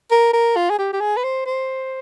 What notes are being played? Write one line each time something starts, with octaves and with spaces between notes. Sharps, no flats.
A#4
A#4
F4
G#4
G4
G4
G#4
B4
C5
C5